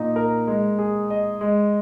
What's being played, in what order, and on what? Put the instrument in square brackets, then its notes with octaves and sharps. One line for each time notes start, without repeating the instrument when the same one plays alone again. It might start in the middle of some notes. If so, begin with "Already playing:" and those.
Already playing: [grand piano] A#2 D#4
A#4
G#3
G#4
D#5
G#3